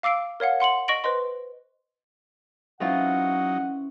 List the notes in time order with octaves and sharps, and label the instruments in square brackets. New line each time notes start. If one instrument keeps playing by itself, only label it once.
[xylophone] F5 D6 E6 C7 D7
A#4 C#5 F5 F#5
F#5 C6 C#7 F#7
D#5 C#6 A#6 D7 F#7
B4 C5 D#5 C6
[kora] E3 C4 F4 [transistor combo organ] F#3 D#4 [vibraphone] C#4 [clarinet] F#5